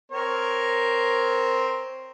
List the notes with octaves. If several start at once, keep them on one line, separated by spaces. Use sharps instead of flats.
C4 A#4 C#5